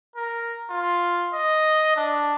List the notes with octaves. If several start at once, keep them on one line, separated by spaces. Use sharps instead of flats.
A#4
F4
D#5
D4